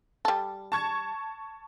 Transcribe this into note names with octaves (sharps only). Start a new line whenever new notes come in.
G3 A4
A5 C#6 G#6